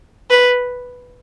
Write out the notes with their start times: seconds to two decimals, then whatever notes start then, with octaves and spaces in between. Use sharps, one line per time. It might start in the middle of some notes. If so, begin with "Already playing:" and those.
0.30 B4